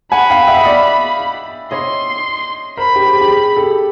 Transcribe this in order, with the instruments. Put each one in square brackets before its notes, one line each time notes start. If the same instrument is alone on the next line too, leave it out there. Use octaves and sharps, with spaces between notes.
[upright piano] F#5 G#5 [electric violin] B5
[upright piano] F5 G5
E5 F#5
D#5
D5 E5
[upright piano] C#5 D#5 [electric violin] C6
[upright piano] A#4 C5 [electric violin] B5
[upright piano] G4
G4
G#4
G4
G#4
G4 A4